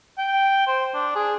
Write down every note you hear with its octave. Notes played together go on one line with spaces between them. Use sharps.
G5
C5
D4
G#4